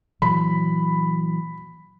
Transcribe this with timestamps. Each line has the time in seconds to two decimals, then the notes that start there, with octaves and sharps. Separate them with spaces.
0.22 A#2 E3 F#3 B5